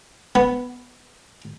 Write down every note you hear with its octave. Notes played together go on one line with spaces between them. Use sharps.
B3